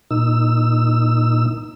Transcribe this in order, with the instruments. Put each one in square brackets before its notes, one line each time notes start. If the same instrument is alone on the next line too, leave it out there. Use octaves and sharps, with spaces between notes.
[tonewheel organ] A#2 D#4 E6